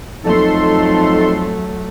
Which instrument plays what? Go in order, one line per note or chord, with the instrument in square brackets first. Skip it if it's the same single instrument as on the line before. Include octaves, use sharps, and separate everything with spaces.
[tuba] F2 [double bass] F#3 A3 [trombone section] D#4 [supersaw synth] A4 C6